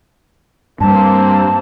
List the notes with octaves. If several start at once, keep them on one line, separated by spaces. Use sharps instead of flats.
G2 G3 A#3 C4 A5